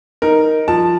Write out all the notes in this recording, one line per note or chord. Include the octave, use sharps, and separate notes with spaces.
D#4 A#4
F3 A5